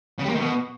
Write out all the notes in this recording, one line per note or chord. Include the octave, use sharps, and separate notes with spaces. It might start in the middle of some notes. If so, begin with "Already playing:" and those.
C#3
G3
A#3
D#3
B2